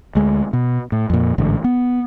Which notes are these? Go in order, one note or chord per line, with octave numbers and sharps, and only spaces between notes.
D2 G#3
B2
A2
F2 A#2
A1 G#2 D3
B3